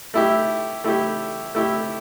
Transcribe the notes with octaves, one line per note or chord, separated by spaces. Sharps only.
A3 E4 G4
A3 E4 G4
A3 E4 G4